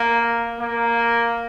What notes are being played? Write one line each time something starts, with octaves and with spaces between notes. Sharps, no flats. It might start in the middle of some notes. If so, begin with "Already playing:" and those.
Already playing: A#3
A#3